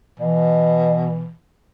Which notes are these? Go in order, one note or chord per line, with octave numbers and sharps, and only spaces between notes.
B2 E3